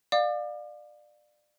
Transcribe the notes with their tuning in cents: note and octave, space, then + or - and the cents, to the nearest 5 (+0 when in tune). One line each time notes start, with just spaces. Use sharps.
D5 +25 F5 +20 D6 +40